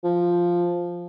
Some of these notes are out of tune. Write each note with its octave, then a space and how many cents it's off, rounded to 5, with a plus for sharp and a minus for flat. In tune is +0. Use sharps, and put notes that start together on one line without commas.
F3 +0